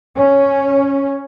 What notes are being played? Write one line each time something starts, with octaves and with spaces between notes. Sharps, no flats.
C#4